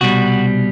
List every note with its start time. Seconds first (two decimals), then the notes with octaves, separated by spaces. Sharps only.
0.01 C2 B2 G3 F#4